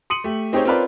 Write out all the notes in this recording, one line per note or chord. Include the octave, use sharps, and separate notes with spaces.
C6 D#6 C#7 D#7 F#7
A3 G4
C4 D#4 G4 G#4 C5 C#5
C4 C#4 F4 A#4 B4 D5